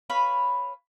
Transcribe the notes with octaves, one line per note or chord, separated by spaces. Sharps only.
B4 C#5 F5 B5